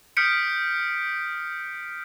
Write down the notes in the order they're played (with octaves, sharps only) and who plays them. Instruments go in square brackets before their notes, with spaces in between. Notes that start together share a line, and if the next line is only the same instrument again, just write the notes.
[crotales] D#6 F6 G6 B6 C#7 D7